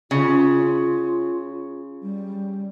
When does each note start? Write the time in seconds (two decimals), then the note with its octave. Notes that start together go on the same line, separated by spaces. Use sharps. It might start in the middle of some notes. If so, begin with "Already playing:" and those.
0.11 C#3 F4
2.02 G3